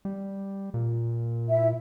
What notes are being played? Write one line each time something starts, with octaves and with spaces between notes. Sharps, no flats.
G3
A#2
E4 E5